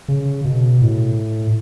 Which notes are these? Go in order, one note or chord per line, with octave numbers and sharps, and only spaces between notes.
C#3
B2
A2